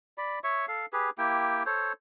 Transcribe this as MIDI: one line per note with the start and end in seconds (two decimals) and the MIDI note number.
0.18 0.39 74
0.18 0.39 83
0.44 0.66 73
0.44 0.66 76
0.44 0.66 85
0.68 0.86 69
0.68 0.86 77
0.93 1.10 67
0.93 1.10 68
0.93 1.10 71
1.18 1.63 58
1.18 1.63 64
1.18 1.63 67
1.18 1.63 79
1.66 1.93 69
1.66 1.93 72
1.66 1.93 73